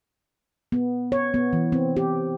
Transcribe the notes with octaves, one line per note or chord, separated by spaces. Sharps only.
B3
C#5
B3
E3
C4
G4